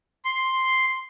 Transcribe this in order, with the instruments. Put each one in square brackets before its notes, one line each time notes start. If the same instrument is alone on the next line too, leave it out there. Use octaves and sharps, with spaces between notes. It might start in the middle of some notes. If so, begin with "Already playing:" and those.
[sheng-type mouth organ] C6